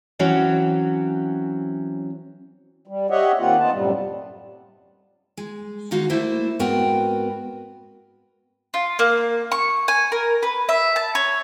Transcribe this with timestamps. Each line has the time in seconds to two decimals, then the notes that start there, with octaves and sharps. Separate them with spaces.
0.19 E3 F#3 C4 C#4
2.87 G3
3.10 G4 C#5 D#5 E5 F#5
3.39 D#3 A#3 C4 F4 F#5
3.59 B3 D#4 F4 A5
3.72 F#2 A2 C3 G3
5.37 G#3
5.91 D#3 G#3 D#4 F#4 F5
6.10 A3 A#3 E4 C5
6.59 G#2 B3 C4 F#4 A#4 G5
8.74 F4
8.99 A#3
9.52 C#6
9.88 G#5
10.12 A#4
10.43 B4
10.69 E5
10.96 A5
11.15 C#5